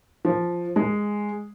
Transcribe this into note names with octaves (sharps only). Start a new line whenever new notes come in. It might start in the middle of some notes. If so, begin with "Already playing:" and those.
F3
G#3